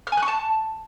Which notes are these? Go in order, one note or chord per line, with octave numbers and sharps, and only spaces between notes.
F6
G#5
F#6
C#6
A5